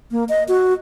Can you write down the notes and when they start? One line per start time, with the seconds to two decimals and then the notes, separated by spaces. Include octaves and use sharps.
0.11 A#3
0.29 D#5
0.48 F#4